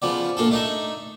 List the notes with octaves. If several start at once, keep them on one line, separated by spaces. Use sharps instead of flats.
C#3 F3 B3 D5
A#2 D4 A4
A3 D4 D#4 E5